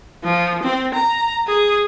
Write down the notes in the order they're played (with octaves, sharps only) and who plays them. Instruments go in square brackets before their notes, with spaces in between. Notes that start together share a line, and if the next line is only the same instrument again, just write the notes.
[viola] F3
C4
A#5
G#4